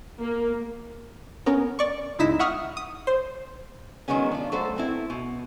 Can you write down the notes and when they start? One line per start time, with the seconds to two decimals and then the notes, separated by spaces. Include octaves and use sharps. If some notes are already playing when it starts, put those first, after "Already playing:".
0.21 A#3
1.46 B3 C#4 A#4
1.79 D5 C#6
2.19 G1 C#2 D#4 E4 B6 E7
2.39 E5 F#5 C#6 D#6 F6
2.77 D#6
3.07 C5
4.08 D#3 F#3 G#3 B3 C#4
4.31 D4 F4
4.52 F#3 A3 A4 C5
4.76 B3 C4 E4
5.10 B2